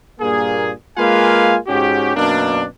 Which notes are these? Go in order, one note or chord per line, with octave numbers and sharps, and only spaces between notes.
G2 A#2 A#3 G#4
G#3 A#3 F4 B4 F5 G#5
G#2 C#4 F#4 G4
F#2 B2 A#3 D4